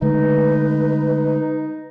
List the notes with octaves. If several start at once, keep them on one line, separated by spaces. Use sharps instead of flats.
D3 G#3 A3 D#4 B4